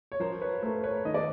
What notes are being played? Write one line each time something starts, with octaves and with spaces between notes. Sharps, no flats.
C#5
F3 A#4 C5
B4 C#5
A3 A#4 C5
B4 C#5
D#3 D#5
D5